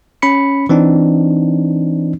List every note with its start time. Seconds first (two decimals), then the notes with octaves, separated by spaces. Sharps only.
0.22 C#4 B5 C#7
0.69 E3 C4 D4 D#4